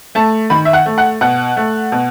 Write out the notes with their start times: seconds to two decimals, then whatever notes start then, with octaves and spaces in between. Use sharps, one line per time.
0.15 A3 A5
0.50 D#3 B5
0.65 E5
0.73 F#5
0.86 A3
0.98 F#5
1.21 B2 F#5
1.57 A3
1.92 B2